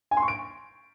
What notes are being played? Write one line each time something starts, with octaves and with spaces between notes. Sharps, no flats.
G#5
C6
C#6
D7